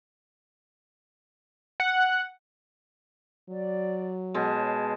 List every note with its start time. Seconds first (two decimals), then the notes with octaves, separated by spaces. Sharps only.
1.80 F#5
3.49 F#3 D5
4.34 B2 G#3 C#5 A5